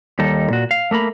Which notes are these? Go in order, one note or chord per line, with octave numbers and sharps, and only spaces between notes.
D#2 G3 D#4 A4
A#2 F#4
F5
A3 A#3 A#4 B5